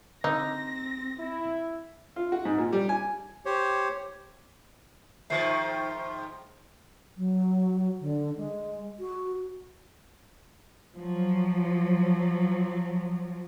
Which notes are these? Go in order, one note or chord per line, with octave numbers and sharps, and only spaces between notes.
D3 C4 D#4 A#6
E4
F4
F#4
G#2
A#2
G3
G#5
G4 C5 C#5
G#2 D#3 F3 E5 C7
F#3
D3
G#3
F#4
F3 F#3